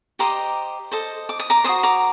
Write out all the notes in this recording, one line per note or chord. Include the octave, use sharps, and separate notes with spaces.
G4 C5 D#5 A#5 D6
A4 C5 D#5
D6
D#6
A#5 D6
F#4 A4 C5 C6 D#6
A#5 D6